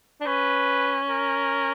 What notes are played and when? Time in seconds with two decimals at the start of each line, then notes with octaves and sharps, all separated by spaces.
0.21 D4
0.26 C#4 B4
1.09 A#4